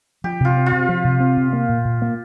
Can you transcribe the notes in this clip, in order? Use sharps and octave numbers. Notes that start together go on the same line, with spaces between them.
F3 G4
C3 F4
C4
F4
C3
F3
C3
C4
C3
A#3
A#2
A#2
A#3